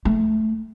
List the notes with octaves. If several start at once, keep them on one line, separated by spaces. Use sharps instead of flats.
A3